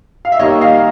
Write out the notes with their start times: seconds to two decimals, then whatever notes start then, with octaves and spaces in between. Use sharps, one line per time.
0.25 F5
0.32 E5
0.39 D#3 G3 A#3 C#5 D#5
0.61 D#5 F5